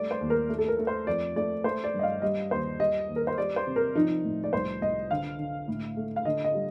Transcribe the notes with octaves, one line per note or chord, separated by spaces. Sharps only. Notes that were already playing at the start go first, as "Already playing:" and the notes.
Already playing: G3 A3 D5
C5
D#2
A#4
A3
A4
A#4
A3
C5
F2 D5
A3 D5
A3 C5
D5
G2
D#5
F5
G3 D#5
D#2 C5
G3 D#5
D#2
A#4
C5
G3 D5
C5
C3
A#4
F3 D#4
A2
D5
C2 C5
C2 D#5
D3 F5
D3
A2
A3
F5
D3 D#5
D#5
G3